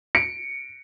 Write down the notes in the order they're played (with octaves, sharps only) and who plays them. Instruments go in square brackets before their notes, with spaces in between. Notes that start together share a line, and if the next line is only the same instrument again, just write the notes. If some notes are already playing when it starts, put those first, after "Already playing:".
[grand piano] C#7 D7